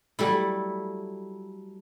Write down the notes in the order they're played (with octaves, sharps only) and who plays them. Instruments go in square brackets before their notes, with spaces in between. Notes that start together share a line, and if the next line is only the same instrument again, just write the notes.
[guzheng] F#3 G3 A3 E4